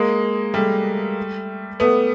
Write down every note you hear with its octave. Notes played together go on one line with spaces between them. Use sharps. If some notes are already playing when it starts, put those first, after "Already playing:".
Already playing: G#3 A#3
G3 A3
A3 B3